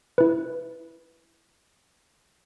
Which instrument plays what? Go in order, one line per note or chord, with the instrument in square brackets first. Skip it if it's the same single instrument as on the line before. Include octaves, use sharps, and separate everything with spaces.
[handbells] E4 B4